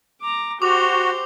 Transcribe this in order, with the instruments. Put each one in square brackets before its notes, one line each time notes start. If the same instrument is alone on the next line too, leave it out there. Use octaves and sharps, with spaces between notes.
[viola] A#5 D6
[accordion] F#4 [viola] G4 C5 [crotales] D6 F7